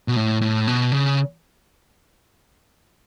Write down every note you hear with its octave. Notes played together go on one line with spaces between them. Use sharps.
B2
A2
A2
B2
C#3